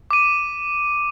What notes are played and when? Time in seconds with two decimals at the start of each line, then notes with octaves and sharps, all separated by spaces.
0.11 D6 D#7